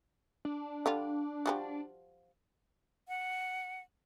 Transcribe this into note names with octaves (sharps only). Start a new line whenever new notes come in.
D4
D3 G3 F4
F3 G3 F#4
F#5